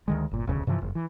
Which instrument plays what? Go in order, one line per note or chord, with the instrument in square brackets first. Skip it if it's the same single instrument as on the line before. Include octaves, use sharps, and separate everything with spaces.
[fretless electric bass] D2 D#3 G#3
G1 A#2
E1 D2 C#3
G2 C3 E3 F3
F#1
E3